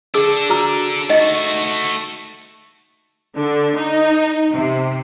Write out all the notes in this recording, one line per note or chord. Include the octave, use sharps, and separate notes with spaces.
D4 G#4 A4 E6
F#4 A#5 E6
A3 D#4 F#4 D#5 F#5
D3
D#4
C3